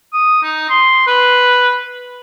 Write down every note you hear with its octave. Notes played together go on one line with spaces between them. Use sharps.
D#6
D#4
C6
B4